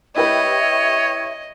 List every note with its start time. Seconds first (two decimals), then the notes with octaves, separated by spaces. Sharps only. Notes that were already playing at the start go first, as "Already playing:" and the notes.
0.16 E4 G4 B4 C#5 D#5 E5